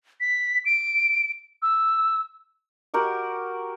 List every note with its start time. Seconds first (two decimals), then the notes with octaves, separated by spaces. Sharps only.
0.20 B6
0.65 D7
1.62 E6
2.94 F#4 G4 A#4 F#5